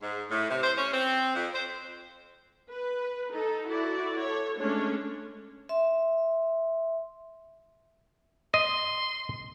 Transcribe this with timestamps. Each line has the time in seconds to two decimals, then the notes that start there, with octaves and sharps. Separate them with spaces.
0.02 G#2
0.31 A2
0.50 C3
0.63 C5
0.78 C#4
0.93 C4
1.35 F2
1.54 C5
2.72 B4
3.31 D#4 A4
3.66 E4 F#4 A4 D5
4.22 A4 C#5
4.59 G#3 A3 C#4 D4 C#5
5.69 E5 C6
8.54 D#5 C6